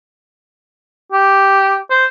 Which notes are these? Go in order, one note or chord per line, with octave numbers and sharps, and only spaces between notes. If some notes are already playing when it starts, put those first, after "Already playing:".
G4
C5